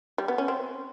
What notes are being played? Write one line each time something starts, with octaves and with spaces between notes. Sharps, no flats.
G3
B3
C#4
C4